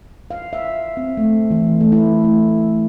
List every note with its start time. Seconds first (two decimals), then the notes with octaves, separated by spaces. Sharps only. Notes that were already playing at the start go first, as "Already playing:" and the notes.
0.31 F5
0.53 E5
0.97 C4
1.17 A3
1.51 E3
1.80 A3
1.92 E4
2.24 A3